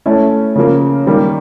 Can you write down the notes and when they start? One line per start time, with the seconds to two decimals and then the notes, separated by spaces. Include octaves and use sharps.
0.06 A3 C#4 E4
0.56 C#3 F3 A#3
1.06 D#3 G3 A#3